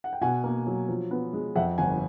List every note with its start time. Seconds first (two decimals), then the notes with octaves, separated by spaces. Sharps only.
0.04 F#5
0.13 G5
0.21 B2 F#5 G#5
0.44 A#3
0.67 F#3
0.88 F3
1.11 B3
1.33 G#3
1.56 F2 E5 F#5
1.78 G1 F#5 G#5